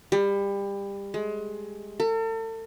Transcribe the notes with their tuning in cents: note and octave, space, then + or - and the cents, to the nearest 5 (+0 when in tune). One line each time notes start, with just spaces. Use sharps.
G3 +25
G#3 +25
A4 +40